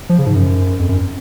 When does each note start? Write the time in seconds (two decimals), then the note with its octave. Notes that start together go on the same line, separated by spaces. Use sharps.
0.09 F3
0.18 C#3
0.27 G#2
0.35 F#2
0.80 F2
0.89 F#2